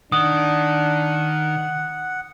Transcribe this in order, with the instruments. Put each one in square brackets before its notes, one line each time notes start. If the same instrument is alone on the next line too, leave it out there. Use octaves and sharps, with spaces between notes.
[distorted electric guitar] D#3 [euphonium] D4 [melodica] F#5 [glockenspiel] D#6